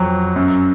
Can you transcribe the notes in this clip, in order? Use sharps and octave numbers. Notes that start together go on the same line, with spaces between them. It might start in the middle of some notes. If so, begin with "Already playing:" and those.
Already playing: F2 F#3
F#2